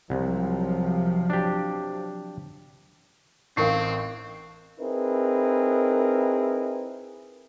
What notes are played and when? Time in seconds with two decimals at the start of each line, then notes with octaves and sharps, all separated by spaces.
0.10 C2 C3 F3 F#3
1.30 D4 G4
3.57 A1 C4 D#4 A#4 F5 C#6 C7
4.79 C4 D#4 E4 G#4 A#4 B4